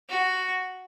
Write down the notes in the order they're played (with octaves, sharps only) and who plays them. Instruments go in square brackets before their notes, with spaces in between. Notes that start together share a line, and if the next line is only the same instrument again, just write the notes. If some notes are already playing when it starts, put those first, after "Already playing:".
[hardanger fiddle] F#4